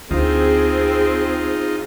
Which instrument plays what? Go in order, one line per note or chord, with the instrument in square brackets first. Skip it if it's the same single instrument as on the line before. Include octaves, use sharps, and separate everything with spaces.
[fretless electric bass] D2 [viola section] C4 G#4 [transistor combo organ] D#4 F4